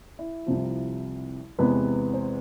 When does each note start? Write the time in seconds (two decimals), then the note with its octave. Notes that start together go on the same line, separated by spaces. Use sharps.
0.19 E4
0.46 C2 C3 F3
1.59 E2 C3 G#3 B3 B4
2.14 C5